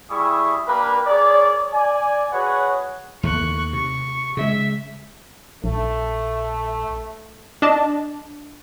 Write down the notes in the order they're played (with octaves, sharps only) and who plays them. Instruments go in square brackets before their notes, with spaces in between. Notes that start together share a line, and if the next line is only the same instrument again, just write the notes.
[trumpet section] G3 E4 G#4 E5 C#6 D#6
A#3 D4 G4 A#4 B4
G#4 A#4 C#5 D5
D5 G#5
F#4 G#4 B4 C#5 F#5
[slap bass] D#2 A3 [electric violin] C#6 F#6
[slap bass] C3 [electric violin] C#6
[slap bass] C#3 G#3 [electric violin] E5
[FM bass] A#1 [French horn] A3
[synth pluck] D4 D#5 A5